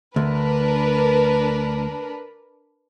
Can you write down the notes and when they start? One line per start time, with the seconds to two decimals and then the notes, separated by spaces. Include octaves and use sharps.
0.16 D2 D4 A#4 B4